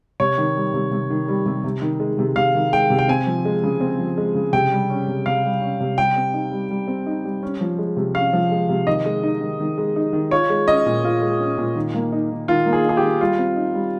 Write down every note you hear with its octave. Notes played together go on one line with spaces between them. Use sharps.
C3 C#5
D#3
G3
C3
C3
D#3
G3
C3
C3
D#3
G#3
C3
C3 F5
D#3
G#3 G5
C3
G5
C4 G#5
F3
G#3
C#3
C4
F3
G#3
C#3
C3 G5
G3
C#4
C3
C3 F5
G3
C#4
C3
G3 G5
C4
D#4
G3
G3
C4
D#4
G3
C#4
F3
G#3
C3
C#4 F5
F3
G#3
C3
D#3 D#5
G#3
D#4
D#3
D#3
G#3
D#4
D#3
F4 C#5
G#3
C#4 D#5
A#2
F4
G#3
C#4
A#2
D#3
A#3
D#4
D#3
D#3 F4
A#3
G#4
D#4 G#4
G4
D#3
G3 F4
C4
D#4
G3